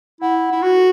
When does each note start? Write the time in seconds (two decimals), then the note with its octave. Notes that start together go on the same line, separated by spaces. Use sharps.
0.21 E4 F#5
0.48 E4 F#5
0.62 F#4
0.76 A4